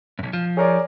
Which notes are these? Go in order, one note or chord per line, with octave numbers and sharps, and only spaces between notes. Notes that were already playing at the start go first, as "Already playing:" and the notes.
B1 F#2
F3
G#4 A#4 C#5 D5